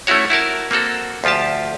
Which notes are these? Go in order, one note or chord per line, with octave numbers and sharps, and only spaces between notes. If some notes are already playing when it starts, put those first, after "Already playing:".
A3 C#4 E4 F#4 C#5
E4 F#4 A#4 A5
A#3 C4 F#4 A4
D2 F3 F4 G4 A5